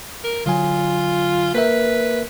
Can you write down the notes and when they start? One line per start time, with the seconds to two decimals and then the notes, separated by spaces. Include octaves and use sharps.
0.24 A#4
0.46 D3 F#3 F4 G#5
1.54 A#3 A#4 B4 E5